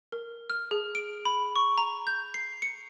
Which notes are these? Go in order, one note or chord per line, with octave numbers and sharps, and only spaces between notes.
A#4
F6
G#4
D7
B5
C#6
A#5
G6
C7
C#7